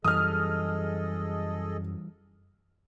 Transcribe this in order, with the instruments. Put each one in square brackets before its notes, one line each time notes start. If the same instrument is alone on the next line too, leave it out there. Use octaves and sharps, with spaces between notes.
[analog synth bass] F#2 [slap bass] E3 G3 [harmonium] G#4 A4 D#5 [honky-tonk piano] D#6 F6